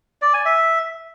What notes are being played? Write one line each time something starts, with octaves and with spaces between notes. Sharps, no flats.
D5
G#5
E5